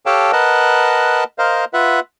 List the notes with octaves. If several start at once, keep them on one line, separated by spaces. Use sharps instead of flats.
G4 A4 C#5 F5 G5 A5
A#4 B4 D#5 F#5 A5
A#4 C5 D#5 F5
F4 B4 E5 F#5